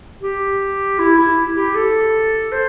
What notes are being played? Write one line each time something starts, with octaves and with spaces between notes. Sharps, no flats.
G4
E4
E4
G4
A4
C5